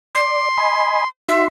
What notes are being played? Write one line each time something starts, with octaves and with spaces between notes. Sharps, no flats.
D5 C6
D#5 G#5 B5
D#4 F#4 E5 C6